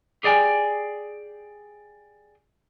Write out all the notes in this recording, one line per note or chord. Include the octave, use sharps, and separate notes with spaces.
G4 G#4 D5 G5 G#5